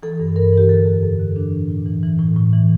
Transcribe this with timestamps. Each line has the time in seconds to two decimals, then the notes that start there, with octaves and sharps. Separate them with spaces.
0.03 E3 A4
0.20 G2
0.36 G2 A#4
0.53 E3 G4
0.69 D3 A4
0.86 F2
1.03 F2 A4
1.20 D3
1.36 E3 D4
1.53 A2
1.70 A2
1.86 E3
2.03 E3
2.19 A2
2.36 A2
2.53 E3